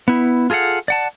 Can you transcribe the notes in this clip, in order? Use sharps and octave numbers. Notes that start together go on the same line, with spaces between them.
B3 E4
F4 G#4 A4 F5 F#5
D5 F#5 A5